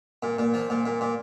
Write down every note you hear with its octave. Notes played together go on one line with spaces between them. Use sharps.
A#2
A#2
F3
A#2
A#2
A#2